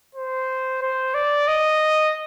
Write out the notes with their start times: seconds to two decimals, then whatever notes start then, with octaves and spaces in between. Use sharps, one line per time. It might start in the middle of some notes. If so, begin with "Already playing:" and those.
0.15 C5
0.82 C5
1.14 D5
1.47 D#5